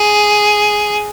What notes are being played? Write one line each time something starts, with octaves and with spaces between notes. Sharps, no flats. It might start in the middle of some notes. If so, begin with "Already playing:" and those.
Already playing: G#4